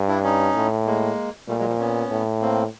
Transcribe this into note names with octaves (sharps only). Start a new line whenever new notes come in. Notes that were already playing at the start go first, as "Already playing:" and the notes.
Already playing: G2
D4 E4
C#4 D#4
A2
G#3 A#3
A#2 G3 A3
F#3 G#3
F3 G3
B3 C#4
A2
A#3 C4